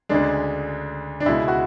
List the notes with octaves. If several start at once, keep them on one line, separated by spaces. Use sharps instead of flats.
D2 C#3 G#3 D4
D4
C#2 B2 G#3 E4
F#4